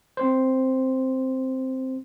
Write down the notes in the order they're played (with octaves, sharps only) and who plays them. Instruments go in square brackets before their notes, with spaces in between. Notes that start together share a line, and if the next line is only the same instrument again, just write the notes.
[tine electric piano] C4 C5